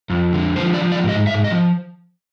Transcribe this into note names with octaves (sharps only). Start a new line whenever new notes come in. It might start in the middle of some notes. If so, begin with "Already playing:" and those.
F2
D3
F3 C5
D5
F3
D5
G#2
D#5
G#2 E5
D#5
F3